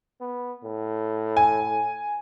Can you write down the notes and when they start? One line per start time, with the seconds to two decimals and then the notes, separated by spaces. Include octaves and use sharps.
0.21 B3
0.64 A2
1.37 G#5